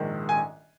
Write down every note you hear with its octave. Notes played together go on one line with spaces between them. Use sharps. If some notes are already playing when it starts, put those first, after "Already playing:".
Already playing: A#1 G#2 D#3
G#5